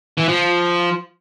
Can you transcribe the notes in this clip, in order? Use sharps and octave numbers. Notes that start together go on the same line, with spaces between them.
E3
F3